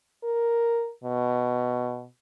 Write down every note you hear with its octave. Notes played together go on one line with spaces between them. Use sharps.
A#4
B2